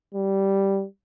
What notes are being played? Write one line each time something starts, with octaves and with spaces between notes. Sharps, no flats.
G3